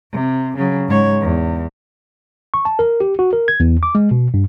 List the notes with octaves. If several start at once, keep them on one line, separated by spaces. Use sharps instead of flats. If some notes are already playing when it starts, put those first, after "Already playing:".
C3
C#3 F#3
G#2 C#5
E2
C#6
A5
A#4
G4
F#4
A#4
G#6
E2
D6
G#3
B2
G2